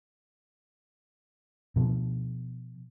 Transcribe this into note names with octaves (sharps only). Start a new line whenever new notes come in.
B2 F3